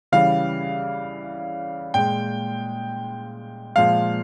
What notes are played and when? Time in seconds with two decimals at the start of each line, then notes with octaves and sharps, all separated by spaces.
0.12 C#3 E3 G3 F5
1.94 A#2 G#3 G5
3.76 A#2 F3 G#3 F5